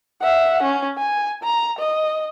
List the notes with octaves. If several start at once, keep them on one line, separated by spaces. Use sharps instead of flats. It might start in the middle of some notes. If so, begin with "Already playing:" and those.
E5 F#5
C#4
G#5
A#5
D#5